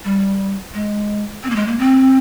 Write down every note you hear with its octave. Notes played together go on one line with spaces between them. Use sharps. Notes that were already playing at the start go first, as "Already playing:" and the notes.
G3
G#3
C4
A#3
G#3
A#3
C4